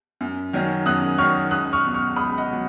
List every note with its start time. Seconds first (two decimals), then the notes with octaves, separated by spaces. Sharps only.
0.21 F#2
0.53 D#3 F#3 C#4
0.86 F#2 D#6 F#6
1.18 D#3 F#3 C#4 C#6 F6
1.51 C#2 D#6 F#6
1.73 C#6 F6
1.84 B2 F#3
1.94 C#6 F6
2.16 C#2 B5 D#6
2.38 D#5 F#5
2.49 B2 F#3